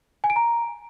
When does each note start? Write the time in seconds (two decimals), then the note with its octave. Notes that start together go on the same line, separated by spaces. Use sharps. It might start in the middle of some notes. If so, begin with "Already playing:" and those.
0.24 G#5
0.30 D7
0.36 A#5